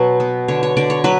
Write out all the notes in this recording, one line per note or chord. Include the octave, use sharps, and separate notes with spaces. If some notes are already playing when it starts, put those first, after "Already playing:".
Already playing: B2 F#3
B3
D3 C#5
C#5
D3 D5
C#5
F#3 B4